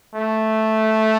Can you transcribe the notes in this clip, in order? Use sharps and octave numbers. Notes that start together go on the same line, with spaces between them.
A3